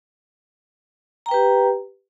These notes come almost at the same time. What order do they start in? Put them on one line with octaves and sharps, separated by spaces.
A#5 G5 B4 G4